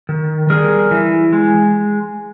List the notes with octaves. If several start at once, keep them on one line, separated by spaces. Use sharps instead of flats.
D#3
G3 G#4 A#4
E3
G#3